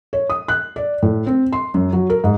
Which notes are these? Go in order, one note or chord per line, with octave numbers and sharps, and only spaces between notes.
C#5
D#6
F#6
D5
A2
C4
C6
F#2
F#3
A#4
G#2